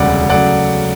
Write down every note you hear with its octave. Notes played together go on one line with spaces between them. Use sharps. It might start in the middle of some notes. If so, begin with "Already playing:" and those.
Already playing: E1 D2 C#3 G3 D5 F#5
C#3 F#3 A3 D5 F#5